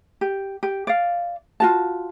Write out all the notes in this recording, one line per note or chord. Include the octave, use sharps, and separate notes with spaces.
G4
G4
D5 F5
F4 F#4 A5